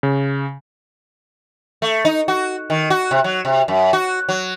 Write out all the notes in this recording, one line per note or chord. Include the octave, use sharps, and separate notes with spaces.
C#3
A3
D#4
F#4
D#3
F#4
C3
F#3
C3
F#2
F#4
F#3